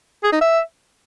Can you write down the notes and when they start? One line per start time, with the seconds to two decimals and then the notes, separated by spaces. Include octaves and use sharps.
0.24 G#4
0.32 D#4
0.41 E5